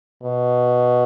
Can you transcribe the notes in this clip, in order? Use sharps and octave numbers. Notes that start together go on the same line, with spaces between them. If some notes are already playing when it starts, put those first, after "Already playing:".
B2